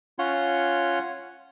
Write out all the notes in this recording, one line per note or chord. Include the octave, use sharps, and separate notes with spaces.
C#4 F4 C#5 F#5 C6